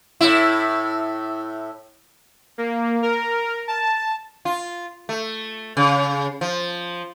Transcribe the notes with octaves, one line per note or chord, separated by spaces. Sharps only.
A2 E4
A#3
A#4
A5
F4
A3
C#3
F3